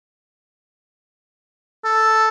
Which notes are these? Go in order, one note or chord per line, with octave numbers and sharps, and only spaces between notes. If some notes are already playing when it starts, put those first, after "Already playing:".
A4